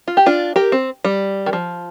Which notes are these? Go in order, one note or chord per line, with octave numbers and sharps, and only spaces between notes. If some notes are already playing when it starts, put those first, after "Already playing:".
F4
G4
D4 F4
G4 A#4
C4
G3
D#3
F3